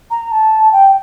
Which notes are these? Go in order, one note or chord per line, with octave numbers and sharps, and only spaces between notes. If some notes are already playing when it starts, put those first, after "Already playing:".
A#5
A5
G5